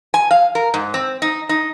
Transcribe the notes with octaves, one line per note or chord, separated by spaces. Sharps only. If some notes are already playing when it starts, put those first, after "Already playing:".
G#5
F5
A#4
G#2
C4
D#4
D#4